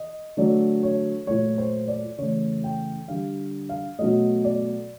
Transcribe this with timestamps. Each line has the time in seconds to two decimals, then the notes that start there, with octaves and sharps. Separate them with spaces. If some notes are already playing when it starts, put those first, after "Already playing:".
Already playing: D#5
0.37 D3 F#3 A3 D5
0.83 C#5
1.27 A#2 F#3 A3 C#5
1.58 C5
1.88 D5
2.18 C#3 E3 A3 C#5
2.64 G5
3.08 D3 G3 F5
3.69 F5
3.99 B2 F#3 A3 D#5
4.44 D5